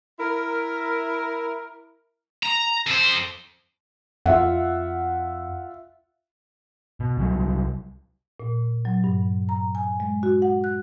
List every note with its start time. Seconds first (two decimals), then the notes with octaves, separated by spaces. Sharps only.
0.19 E4 A#4
2.43 A#5
2.87 F2 C5
4.26 F2 F4 E5 F#5
7.00 B2
7.17 C2 F#3 G3
8.40 A#2
8.85 F#3
9.04 G2
9.49 A#5
9.75 G#5
10.00 G#3
10.23 F#4
10.42 F#5
10.64 F#6